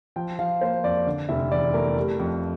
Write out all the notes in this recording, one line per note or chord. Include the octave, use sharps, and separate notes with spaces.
F3 G5
F3 F5
A#3 C5
F2 D5
D3
F1 E5
E2 D5
A3 A#4
G3
F2